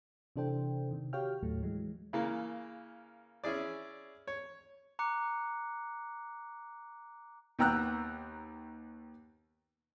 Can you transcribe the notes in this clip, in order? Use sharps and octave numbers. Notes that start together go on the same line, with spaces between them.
C3 E3 D4 A4 C5 G5
C3 D#3
F#4 G4 C#5 F5 G5 F6
D#2 A2 F#3 A3
E3 F#3 G#3
C#3 E3 A#3
C#4 E4 G#4 D5
C#5
A#5 D6 F#6 C#7
D#2 B3 G5 A#5 E6 F#6